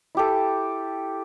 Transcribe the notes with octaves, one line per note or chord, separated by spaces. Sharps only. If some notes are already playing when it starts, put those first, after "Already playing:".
E4 G4 A4